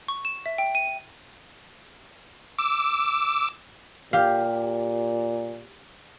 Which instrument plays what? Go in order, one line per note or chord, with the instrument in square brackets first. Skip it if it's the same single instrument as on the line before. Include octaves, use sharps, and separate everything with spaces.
[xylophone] C#6
E7
E5
G5
D#7
[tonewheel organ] D6 E6
[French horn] A#2 [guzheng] G4 F5